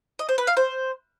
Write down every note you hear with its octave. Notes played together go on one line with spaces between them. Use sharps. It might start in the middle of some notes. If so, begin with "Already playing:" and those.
D#5
C5
B4
F5
C5